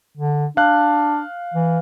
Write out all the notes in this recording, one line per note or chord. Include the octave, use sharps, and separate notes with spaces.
D3
D4 F5 F#6
E3